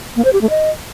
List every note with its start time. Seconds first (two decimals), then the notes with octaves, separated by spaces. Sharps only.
0.16 A#3
0.25 C5
0.33 G4
0.41 A3
0.50 D#5